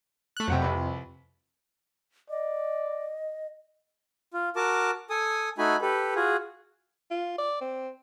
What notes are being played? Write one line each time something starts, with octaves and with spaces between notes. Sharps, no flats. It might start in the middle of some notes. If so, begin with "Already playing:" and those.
A3 F#6
F2 C3 F#3 F#5 G5
C2 B4
D5 D#5
F4
F#4 A#4 A5 D6
A4 G#5 D#6
A3 D#4 F#4 G#5 B5
G4 A4 B4
F4 F#4 G#4
F4
D5
C4